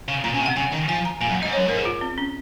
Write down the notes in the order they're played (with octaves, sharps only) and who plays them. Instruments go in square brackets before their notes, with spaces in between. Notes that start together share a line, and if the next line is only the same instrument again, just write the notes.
[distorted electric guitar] C#3
[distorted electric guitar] A#2 [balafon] A#5
[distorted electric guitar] C#3 [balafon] G#5
[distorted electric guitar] C3
[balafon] F#5
[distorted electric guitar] C#3 [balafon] G#5
[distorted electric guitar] D#3
[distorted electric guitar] F3 [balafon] G#5
[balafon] A#5
[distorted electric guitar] A#2 [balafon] G#5
[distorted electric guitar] F#2
[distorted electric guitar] G#2 [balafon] D#5
[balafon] C#5
[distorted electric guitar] F#2
[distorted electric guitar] G#2 [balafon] A#4
[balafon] G#4
F4
C4
C#4